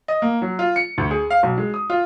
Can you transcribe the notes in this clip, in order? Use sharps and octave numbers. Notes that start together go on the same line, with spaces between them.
D#5
A#3
F#3
F4
C#7
D2
G#4
F5
B1
G#3
D#6
F4